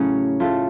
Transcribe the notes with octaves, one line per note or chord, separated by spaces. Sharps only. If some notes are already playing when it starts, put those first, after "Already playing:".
Already playing: A2 C#3 F#3 A3 C#4
A3 F4 A4